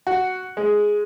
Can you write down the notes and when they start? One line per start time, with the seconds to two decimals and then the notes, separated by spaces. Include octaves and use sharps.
0.07 F#4
0.57 G#3